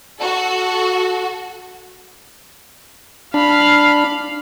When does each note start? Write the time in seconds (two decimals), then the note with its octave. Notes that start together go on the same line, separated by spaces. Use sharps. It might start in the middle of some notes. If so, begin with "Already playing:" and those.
0.21 F#4 A4
3.34 D4 F5 B5